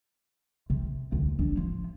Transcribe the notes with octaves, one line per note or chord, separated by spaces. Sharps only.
C3
D2
D4
F3